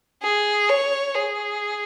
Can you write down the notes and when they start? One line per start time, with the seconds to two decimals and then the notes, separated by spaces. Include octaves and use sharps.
0.23 G#4
0.69 C#5
1.15 G#4